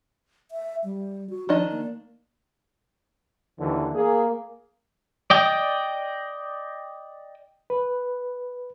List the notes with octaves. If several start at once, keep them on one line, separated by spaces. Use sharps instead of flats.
E5
G3
F#4
D#3 F3 D4 D#5
A#3
D#2 D3 E3
A#3 G#4
D5 D#5 G5
B4